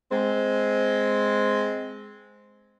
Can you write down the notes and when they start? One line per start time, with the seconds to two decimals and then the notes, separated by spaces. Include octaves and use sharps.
0.12 G#3 C4